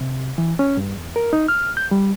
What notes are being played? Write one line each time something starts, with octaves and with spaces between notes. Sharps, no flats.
C3
E3
C#4
G2
E2
A#4
D#4
F6
G6
G3